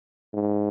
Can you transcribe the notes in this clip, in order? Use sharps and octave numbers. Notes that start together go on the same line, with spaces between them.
G#2